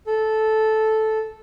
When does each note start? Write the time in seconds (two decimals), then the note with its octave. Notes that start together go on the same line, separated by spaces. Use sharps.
0.07 A4